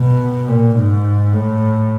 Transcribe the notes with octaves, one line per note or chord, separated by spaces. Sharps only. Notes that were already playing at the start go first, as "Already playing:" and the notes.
Already playing: B2
A#2
G#2
A2